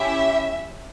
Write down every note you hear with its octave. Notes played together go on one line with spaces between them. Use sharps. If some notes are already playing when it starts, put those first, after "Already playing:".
Already playing: C#4 E4 G4 E5